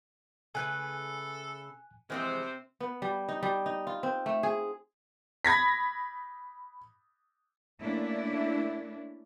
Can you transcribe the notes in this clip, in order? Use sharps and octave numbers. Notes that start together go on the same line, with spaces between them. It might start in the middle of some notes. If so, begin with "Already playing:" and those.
C#3 A3 A4 B4 G#5 F#6
C3 E3 F3 G#3 C4 C5
B3
G3
D#4
G3
D#4
F4
C4
A3
G#4
B5 G#6 A#6 B6
A3 A#3 C#4 D4 E4